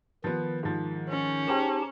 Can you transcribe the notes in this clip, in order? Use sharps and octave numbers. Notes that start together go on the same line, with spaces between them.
D#3 F3 B3
G#2 F3
C#4
D#4 G4 G#4 C5 G5 A5